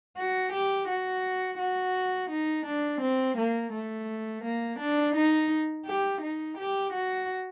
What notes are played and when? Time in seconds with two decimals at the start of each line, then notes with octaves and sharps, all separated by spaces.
0.17 F#4
0.52 G4
0.88 F#4
1.58 F#4
2.30 D#4
2.66 D4
3.01 C4
3.37 A#3
3.73 A3
4.44 A#3
4.79 D4
5.15 D#4
5.86 G4
6.21 D#4
6.58 G4
6.92 F#4